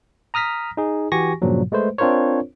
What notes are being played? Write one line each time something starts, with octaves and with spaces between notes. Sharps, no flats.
A#5 D#6 F6 A#6 B6
D#4 G#4
E3 F#4 G4 G#5 C#6 A#6
G2 A#2 C#3 F3 F#3
G#3 A3 B4 C5
C4 D4 F4 A#4 C5 C#5